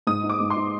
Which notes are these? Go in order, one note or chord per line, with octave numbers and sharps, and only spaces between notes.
G#2 D#6
D#4
D6
G#2
C6
D#4